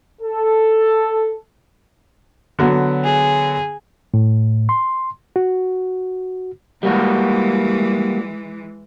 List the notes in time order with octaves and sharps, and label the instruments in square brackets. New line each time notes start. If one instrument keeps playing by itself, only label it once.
[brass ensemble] A4
[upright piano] D3 F#3 B3
[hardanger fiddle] G#4
[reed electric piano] A2
C6
F#4
[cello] E3 G#3 [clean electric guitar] G3 A#3 F#4